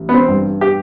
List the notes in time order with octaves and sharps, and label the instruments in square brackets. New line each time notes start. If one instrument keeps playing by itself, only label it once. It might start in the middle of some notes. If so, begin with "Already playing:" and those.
Already playing: [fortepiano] A1
B3
C4
G2
G4